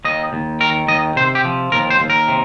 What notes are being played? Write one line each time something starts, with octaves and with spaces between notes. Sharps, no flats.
D#2 D#5
D#2
D#3 A#4
D#2 D#5
C3 C5
G4
F3
D#2 A#4
C5
D#2
A#4
C3